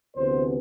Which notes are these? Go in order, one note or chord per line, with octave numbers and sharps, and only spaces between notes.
D2 C3 E3 B3 C5